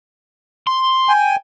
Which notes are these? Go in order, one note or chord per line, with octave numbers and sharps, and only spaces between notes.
C6
G5 G#5